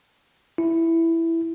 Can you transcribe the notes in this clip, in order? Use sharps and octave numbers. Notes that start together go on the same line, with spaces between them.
E4